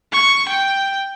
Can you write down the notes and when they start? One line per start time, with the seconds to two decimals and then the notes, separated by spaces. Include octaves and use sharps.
0.13 C#6
0.48 G5